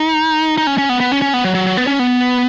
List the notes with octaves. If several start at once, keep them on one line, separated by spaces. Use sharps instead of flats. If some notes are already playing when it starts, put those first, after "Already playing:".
Already playing: D#4
D#4
C#4
C#4
B3
B3
C#4
C#4
B3
F#3
F#3
F#3
B3
C#4
B3